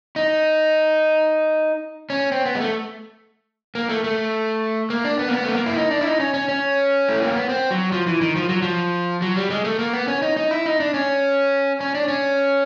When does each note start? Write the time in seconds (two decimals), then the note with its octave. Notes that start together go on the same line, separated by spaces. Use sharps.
0.16 D#4
2.10 C#4
2.32 C4
2.46 B3
2.55 G#3
2.60 A3
3.75 A#3
3.89 A3
4.04 A3
4.90 A#3
5.04 D4
5.19 B3
5.28 A#3
5.33 B3
5.44 A3
5.55 A#3
5.66 E4
5.77 D#4
5.91 D4
6.01 E4
6.06 D#4
6.20 C#4
6.34 C#4
6.49 C#4
7.09 A3
7.22 A#3
7.35 B3
7.49 C4
7.71 F#3
7.92 F3
8.07 E3
8.21 D#3
8.36 F3
8.49 F#3
8.62 F3
9.22 F#3
9.36 G3
9.50 G#3
9.64 A3
9.79 A#3
9.93 B3
10.08 C#4
10.22 D#4
10.37 D#4
10.51 E4
10.66 D#4
10.80 D4
10.94 C#4
11.81 C#4
11.95 D4
12.08 C#4